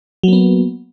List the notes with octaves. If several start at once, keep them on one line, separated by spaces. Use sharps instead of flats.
F#3 A#3 B3